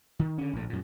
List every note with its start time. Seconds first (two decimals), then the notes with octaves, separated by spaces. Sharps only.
0.19 D#3
0.38 D3 C#4
0.53 A#1 A2
0.70 F#2 A#2